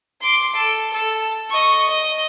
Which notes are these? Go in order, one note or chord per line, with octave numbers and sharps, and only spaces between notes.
C6 D6
A4
A4
D#5 C#6
D#5